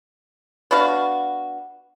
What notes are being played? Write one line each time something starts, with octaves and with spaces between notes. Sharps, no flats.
B3 D4 F#4 F5